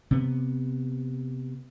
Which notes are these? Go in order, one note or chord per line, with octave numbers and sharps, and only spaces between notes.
C3 B3